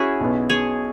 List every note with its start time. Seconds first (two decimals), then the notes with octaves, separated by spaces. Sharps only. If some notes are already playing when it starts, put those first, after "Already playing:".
Already playing: C#4 E4 F#4 G#4
0.20 B1 B2 B3
0.49 G#4 C#5